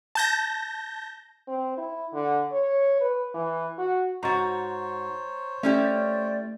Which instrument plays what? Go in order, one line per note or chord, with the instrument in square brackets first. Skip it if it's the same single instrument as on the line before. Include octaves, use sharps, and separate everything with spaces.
[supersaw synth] A5 G6 A#6
[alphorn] C4
E4
D3
C#5
B4
E3
F#4
[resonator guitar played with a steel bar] G#2 F#4 [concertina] C5 C#5 [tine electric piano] A#5 C#6 A6
[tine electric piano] A3 [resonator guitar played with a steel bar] C#4 E4 G4 [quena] D5